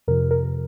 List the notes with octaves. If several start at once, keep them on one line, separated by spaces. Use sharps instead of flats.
F2 C3 F3 A#4
A#4